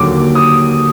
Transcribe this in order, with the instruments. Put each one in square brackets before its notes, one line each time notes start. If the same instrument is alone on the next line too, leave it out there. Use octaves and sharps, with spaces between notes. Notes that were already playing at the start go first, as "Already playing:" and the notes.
Already playing: [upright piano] D#2 D3 F#3 A#3 [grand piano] D6
[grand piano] D#6